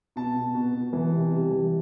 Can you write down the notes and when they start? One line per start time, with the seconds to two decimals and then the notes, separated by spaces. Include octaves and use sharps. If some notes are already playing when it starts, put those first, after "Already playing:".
0.16 B2 A5
0.36 B2
0.54 B2
0.74 B2
0.93 E3
1.12 C3
1.33 G3
1.51 E3